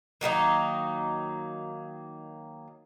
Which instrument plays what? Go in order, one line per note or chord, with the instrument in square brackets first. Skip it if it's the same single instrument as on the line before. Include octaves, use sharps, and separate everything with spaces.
[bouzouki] D#3 F#3 A#3 D#4